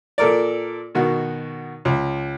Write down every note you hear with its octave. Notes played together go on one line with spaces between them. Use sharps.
A#2 A4 A#4 D5
B2 D#3 F#4
C#2